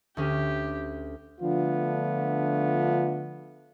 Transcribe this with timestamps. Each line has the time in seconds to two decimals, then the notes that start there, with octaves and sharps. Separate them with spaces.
0.17 D2 C#4 G4 F6
1.41 D3 F3 A3 B3 D4 F4